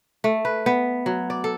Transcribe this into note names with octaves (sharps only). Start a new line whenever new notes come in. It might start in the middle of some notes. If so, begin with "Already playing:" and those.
A3
B4
B3
F#3
D5
A4